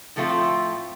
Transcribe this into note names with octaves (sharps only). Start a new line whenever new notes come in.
A2 F3 A3 C4 F4